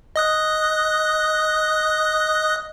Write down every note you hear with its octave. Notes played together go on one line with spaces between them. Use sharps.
D#5 D#6 F#6